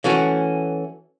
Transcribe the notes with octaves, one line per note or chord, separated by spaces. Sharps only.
E3 A3 C#4 F#4